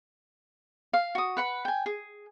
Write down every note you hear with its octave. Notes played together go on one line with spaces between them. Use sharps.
F5
F#4 D#6
B4 F#5 B5
G5 G#5
G#4